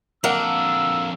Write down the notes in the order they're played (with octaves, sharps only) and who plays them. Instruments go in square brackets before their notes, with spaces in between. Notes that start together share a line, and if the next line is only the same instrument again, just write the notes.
[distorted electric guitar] F2 D4 [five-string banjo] F#3 A#4 F#5 [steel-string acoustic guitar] A#3 [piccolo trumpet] E6